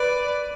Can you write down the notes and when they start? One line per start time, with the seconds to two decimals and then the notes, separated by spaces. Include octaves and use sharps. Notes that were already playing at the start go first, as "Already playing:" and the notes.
Already playing: B4 D5